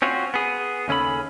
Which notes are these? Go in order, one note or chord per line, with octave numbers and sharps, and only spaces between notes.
C4 C#4 F4 F#4
B3 G#4
D#2 C#3 C#4 A4 B5